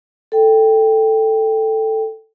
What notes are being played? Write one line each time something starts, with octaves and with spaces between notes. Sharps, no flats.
A4 G5